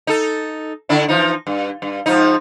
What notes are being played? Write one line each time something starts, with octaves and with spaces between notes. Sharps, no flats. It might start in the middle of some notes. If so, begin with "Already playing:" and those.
D#4 A4
D3 D4 E4
E3 F3 D#4
G2
G2
G#2 F3 D#4